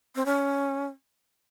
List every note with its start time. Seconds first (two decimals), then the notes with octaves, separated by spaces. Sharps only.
0.16 C4
0.26 C#4